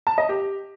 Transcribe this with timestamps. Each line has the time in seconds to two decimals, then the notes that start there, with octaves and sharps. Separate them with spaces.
0.07 A5
0.18 D#5
0.29 G4